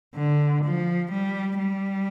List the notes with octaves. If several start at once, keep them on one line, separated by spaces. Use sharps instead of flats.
D3
F3
G3
G3